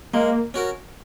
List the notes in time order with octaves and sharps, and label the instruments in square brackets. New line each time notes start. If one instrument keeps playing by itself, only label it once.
[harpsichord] G#3 [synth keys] A#3
[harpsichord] C#4 F#4 A#4